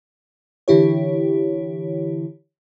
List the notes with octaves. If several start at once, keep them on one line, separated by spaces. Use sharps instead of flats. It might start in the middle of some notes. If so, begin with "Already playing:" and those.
D3 E3 E4 G4 C#5